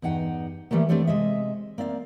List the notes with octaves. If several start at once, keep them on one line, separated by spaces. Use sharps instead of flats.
E2 G2 D#4 F#5 G5
E3 G3 A3 A#3
A3 C4 D4 G4 A4 C#5
C3 G#3 D#5 E5
A#3 C4 D5 E5 F5